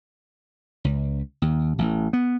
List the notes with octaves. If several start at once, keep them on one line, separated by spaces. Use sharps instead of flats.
C#2
D#2
A1
B3